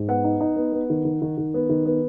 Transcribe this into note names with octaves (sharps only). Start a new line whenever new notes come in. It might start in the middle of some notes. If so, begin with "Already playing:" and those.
Already playing: G#2
B3 F#5
D#4
D#4
B3
B3
D#3
D#3
D#3
D#3
B3
D#3
B3